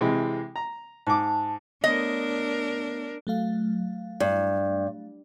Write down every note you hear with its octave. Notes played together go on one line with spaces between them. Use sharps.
C3 E3 G#3
A#5
G#2 A5 D6
A3 B3 D4 A#4 C#5 D#5
F#3 A3 F5
G2